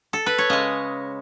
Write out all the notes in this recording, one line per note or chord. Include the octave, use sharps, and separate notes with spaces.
A4
B4
C#5
C#3 G#3 D#5